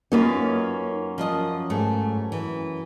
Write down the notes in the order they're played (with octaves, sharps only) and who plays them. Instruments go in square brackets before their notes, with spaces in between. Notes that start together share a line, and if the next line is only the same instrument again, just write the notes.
[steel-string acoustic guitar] F#2 A#3 C#4 [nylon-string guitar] D#4 F4 B4
[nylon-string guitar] F3 F4 D#5
G#2 A3
E3